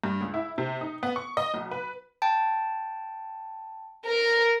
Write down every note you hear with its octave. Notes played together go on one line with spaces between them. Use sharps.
G2
C#2
E4
C3
D#4
B3
C#6
D#5
B1
B4
G5 A5
A#4